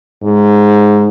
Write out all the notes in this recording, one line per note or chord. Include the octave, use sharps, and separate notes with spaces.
G#2